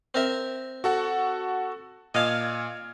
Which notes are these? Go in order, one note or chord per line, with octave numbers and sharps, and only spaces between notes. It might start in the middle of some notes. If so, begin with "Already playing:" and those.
C4 A#4 E5
F#4 A4 F#5
A#2 D#5 F5 A5 F6 G#6